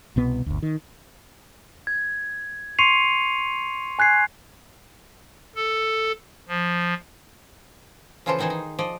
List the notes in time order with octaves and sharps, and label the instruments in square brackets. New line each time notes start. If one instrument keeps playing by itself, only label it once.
[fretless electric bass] C2 B2 B3
G1 D2
D#3
[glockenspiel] G#6
C6 C#6 C7 C#7 D#7 F7
G#5 F#6 G#6 C7
[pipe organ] A4
F3
[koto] C#3 E3 F3 F4 A4 C5
D#3 E3 D#4 G#4 C5
D#4
F3 D5 D#5